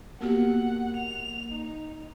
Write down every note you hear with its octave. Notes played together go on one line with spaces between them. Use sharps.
A#3 B3 F#4 G4 F#5
F7
D#4